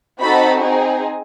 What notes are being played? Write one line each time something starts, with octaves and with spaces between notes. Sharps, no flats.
C4 D#4 F#4 A4 B5
C4 D#4 G#4